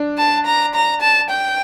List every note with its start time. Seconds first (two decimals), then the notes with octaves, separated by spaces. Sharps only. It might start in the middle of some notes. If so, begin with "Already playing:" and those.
Already playing: D4
0.18 A5
0.46 A#5
0.74 A#5
1.01 A5
1.30 G5